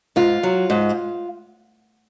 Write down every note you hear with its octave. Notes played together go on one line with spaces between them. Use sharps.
G#2 F4
F#3
G#2